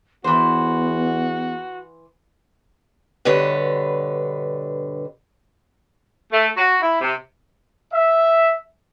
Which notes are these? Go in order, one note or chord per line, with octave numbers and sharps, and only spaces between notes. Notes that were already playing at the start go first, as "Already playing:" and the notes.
E2 E3 B3 F#4 C5
G2 B2 D3 B4 C#5
A3
F#4
E4
C3
E5